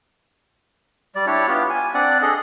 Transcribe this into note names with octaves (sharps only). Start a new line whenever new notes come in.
G3 D5
D4 E4 G4 C#5
B3 F4 G4
G#5
C4 D4 D5 F#5
G#4 A4 D#5